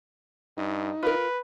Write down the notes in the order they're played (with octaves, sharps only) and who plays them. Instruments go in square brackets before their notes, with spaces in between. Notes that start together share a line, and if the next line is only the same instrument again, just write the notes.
[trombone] G2 [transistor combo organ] D#4
[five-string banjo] F4 A#4 [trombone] B4